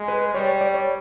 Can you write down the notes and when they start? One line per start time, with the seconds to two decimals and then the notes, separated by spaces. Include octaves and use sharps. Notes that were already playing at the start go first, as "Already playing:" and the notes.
Already playing: G#3
0.08 B4
0.34 G3 C#5
0.48 C#5
0.61 D5
0.74 C#5